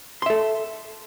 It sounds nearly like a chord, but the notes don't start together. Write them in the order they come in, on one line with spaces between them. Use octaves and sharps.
C6 E5 A4